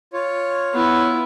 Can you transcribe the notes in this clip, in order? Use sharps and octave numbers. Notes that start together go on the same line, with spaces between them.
F4 C#5
B3 E4